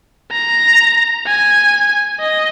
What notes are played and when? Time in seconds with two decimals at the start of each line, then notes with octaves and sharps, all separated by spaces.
0.32 A#5
1.26 G#5
2.20 D#5